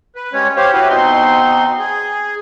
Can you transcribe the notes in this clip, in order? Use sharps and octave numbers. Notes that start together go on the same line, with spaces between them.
B4
G3 G#3 C#4 C#5
G4 C5 C#5 F5
E4 F#4 G4 B4
B2 C4 D#4 C6
G#4